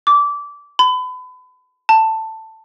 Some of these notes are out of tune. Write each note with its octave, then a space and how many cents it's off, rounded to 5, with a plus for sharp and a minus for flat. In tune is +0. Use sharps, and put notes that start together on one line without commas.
D6 -20
B5 +35
A5 +10